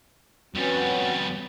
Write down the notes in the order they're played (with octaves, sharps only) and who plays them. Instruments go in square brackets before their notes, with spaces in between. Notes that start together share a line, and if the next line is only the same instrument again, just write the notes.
[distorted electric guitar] F2 G3 [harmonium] B3 C#4 F#4